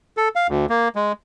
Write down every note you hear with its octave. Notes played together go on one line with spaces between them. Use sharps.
A4
F5
D2
A#3
G#3